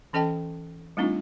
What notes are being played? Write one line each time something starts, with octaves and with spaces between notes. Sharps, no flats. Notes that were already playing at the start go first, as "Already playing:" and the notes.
E3 C#4 A4 D#5 G5 A5
G3 A3 C4 D4 D#4 F4